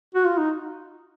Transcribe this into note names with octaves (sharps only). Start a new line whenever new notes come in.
F#4
F4
D#4